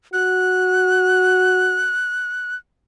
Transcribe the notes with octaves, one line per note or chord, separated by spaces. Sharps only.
F#4 F#6